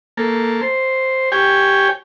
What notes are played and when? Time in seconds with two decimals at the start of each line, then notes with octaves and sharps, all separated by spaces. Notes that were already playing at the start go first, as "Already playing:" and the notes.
0.17 A#3 A4
0.61 C5
1.32 G4 C#5 G5 G#5